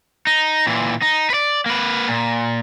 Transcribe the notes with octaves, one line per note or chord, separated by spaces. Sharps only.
D#4
A#2 E3
D#4
B4 D5
A#3 B4
A#2